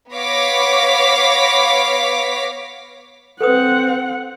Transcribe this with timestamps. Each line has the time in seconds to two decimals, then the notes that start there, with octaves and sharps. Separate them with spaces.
0.12 B3 C#5 F5 D6 A#6 B6
3.41 C4 A4 B4 F#5 D#6